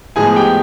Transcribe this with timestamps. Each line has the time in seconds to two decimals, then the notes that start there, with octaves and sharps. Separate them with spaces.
0.16 A2 F3 G#3 B3 G#4 G#5
0.36 G4 G5